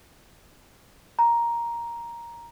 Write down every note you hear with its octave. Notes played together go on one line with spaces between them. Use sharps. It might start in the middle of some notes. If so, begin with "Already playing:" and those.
A#5